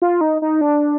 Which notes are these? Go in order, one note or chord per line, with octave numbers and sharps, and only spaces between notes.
F4
D#4
D#4
D4